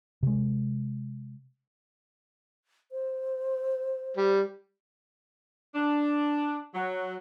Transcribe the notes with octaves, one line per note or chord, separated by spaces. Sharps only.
C3 G#3
C5
G3
D4
F#3